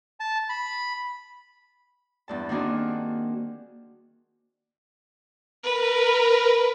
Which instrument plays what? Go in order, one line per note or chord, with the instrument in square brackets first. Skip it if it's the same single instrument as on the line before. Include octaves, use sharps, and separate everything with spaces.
[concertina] A5
B5
[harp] E2 G2 A5
D#3 A#3 C4 D4 F#4 G#4
[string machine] A#4 [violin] B4